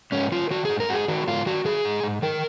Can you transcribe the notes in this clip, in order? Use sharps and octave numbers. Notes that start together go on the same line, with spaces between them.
G#2 C#4
D#3 F4
D#3 F#4
G#2 G#4
A#4
G#2 F#4 G#4
D#3 F#4
G#2 F4
D#3 F#4
D#3 G#4
G#2
G#2
D#3 A#4